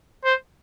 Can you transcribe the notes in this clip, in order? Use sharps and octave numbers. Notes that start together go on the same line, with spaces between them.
C5